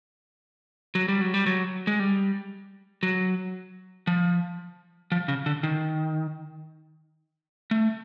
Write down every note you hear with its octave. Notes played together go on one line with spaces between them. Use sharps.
F#3
G3
F#3
G3
F#3
G#3
G3
F#3
F3
F3
C#3
D3
D#3
A3